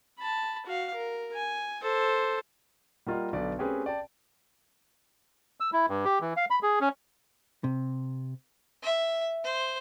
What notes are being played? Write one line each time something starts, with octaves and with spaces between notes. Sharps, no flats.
A5 B5
F#4 F5
A#4
G#5
A4 C5
G3 A#3 F4 D#5 F#5
B1 D3 B3 D5
A3 C4 C#4 G4 G#4 B4
D5 G5 A5
E6
E4
G2
G4
E3
F5
B5
G#4
C#4
C3
E5
C5